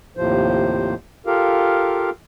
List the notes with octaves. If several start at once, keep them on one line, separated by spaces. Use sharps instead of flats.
D#2 A2 C3 F3 C5
F4 G4 A4 A#4 F5